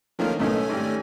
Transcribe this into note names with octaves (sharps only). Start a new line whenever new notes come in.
D3 D#3 F3 A#3 C#4 A#4
B1 A2 A3 C#4 D#5 G#5
G#1 G3